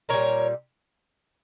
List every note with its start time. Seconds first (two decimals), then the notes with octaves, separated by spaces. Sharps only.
0.09 A#2 G3 A#4 C#5